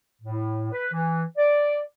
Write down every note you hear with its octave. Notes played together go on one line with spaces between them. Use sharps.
A2
B4
E3
D5